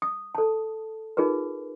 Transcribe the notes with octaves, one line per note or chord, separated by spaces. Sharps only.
D#6
A4 A5
D#4 F4 G#4 A#4 B4